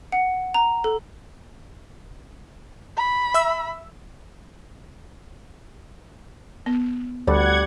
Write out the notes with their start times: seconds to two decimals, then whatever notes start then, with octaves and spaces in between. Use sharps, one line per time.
0.12 F#5
0.54 A#5
0.84 A4
2.97 B5
3.34 E5 E6
6.66 B3
7.27 D2 G3 D5 F#5 G#6